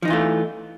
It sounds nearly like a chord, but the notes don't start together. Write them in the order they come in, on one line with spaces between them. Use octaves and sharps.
F3 D#4 E3 F4 A3